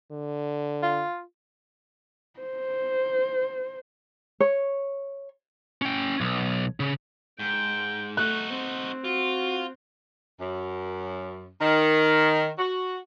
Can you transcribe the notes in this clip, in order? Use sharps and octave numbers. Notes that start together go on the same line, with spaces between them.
D3
F4
C5
C#5
C#4 G5
B1
C#3
G#2 G5
A3 D#4 F#4 F#6
C4
F4 F#4
F#2
D#3
F#4